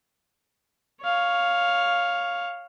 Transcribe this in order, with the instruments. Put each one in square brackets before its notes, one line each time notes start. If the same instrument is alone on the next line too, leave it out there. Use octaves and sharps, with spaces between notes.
[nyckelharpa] C#5 F5